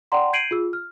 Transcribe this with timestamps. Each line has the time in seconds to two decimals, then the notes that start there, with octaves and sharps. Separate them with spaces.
0.12 D5 F#5 G5 A#5 C6
0.33 G6 G#6 C7 D7 D#7 F#7
0.51 F4 G#4 E6
0.73 F6